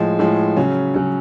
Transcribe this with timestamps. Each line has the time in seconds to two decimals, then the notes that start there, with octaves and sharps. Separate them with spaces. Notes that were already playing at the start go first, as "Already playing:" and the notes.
Already playing: A2 F3 G#3
0.19 A2 F3 G#3
0.57 C#3 F#3 C#4
0.94 C#3 F#3 C#4